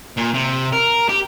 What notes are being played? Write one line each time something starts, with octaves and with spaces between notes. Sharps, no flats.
A#2
C3
A#4
G4